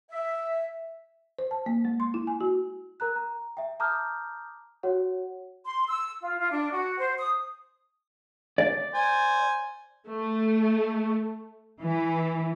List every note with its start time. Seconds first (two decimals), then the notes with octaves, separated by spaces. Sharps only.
0.11 E5
1.39 C5
1.51 A5
1.66 A#3
1.85 G#3
2.00 C6
2.14 E4
2.27 G#5
2.41 F#4
3.00 A#4 A#5 F#6
3.16 A#5
3.57 E5 G5
3.80 A5 A#5 D6 D#6 F6 G6
4.83 F#4 C#5 F#5
5.66 C6
5.89 E6
6.21 F4
6.39 F4
6.52 D4
6.72 F#4
6.98 C5
7.19 D#6
8.58 D5
8.94 C5 G#5
10.09 A3
11.81 E3